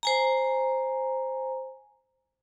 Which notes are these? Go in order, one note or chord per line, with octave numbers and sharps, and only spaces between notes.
C5 G#5 A#5